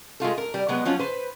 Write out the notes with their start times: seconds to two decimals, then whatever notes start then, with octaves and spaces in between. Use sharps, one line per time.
0.20 G#3 A3 F4 A4
0.38 A#4
0.54 G3 A#4
0.68 F#3 G#3 B3
0.85 F3 F#3 C#4 F4
0.99 B4 C5